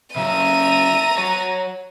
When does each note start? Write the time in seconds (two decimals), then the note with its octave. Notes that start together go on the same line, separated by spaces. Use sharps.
0.16 C#3 F#3 E5 A#5 D#7
1.18 F#4 C#5